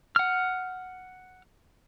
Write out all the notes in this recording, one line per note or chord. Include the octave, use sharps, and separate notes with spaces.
F#5 F6